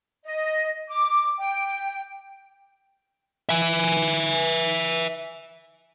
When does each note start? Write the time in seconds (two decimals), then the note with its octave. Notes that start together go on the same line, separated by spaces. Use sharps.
0.24 D#5
0.88 D6
1.38 G5
3.49 E5 G#5